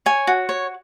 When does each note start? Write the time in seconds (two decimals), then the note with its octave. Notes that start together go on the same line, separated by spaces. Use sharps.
0.06 C#5 G#5
0.27 F#4
0.49 C#5